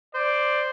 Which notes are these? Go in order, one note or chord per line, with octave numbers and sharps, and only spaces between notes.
C5 D5